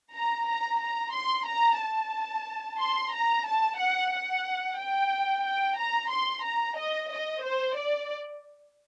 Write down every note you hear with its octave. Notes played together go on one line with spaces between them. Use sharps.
A#5
A#5
A#5
C6
A#5
A5
C6
A#5
A5
F#5
F#5
G5
G5
A#5
C6
A#5
D#5
D#5
C5
D5